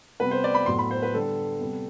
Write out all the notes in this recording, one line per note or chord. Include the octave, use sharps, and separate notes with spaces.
C3 G3 B3 B4
C5
D5
B5
A2 F#3 B3 C6
B5
C5
B4
D3 G3 B3 A4
C3 G3 B3